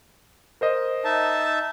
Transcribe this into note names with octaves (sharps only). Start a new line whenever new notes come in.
A#4 C5 D#5
D#4 E5 A5